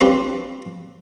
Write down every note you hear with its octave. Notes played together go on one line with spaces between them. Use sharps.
C4 D4 F4 G4 B4 C5